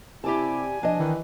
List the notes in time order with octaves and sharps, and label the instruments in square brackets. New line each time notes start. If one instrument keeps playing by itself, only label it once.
[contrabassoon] C3 [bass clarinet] E4 [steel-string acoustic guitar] G4 D5 A5 [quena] G#5
[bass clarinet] F3 [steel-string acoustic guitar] D4 D#5
[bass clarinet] D#3 [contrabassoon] E3